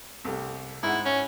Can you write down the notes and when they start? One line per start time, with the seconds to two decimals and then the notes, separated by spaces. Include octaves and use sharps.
0.25 C2 A3 G4
0.83 G#2 E4 F#5
1.06 C#4